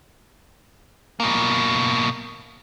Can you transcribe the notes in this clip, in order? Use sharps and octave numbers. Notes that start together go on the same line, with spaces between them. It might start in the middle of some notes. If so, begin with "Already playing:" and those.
B2 A#3